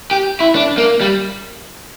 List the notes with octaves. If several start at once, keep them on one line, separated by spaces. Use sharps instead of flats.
G4
E4
D4
A#3
G3